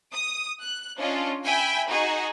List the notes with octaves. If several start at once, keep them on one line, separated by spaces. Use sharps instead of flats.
D#6
F#6
C#4 D4 F4 D#5
E5 G5 G#5 B5
D#4 F#4 G#4